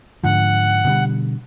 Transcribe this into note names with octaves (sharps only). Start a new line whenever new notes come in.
G#2 D3 F3 F#5
B2 D3 G3